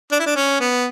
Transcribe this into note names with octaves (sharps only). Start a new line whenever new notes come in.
D4
E4
D4
C#4
B3